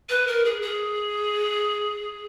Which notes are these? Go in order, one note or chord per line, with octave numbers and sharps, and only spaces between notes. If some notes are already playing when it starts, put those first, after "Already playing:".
B4
A#4
G#4
G#4